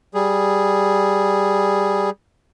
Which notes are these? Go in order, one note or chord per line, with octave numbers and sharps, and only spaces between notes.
G3 G#4